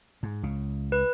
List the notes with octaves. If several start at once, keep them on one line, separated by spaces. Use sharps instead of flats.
G#2
C#2 C#3
B4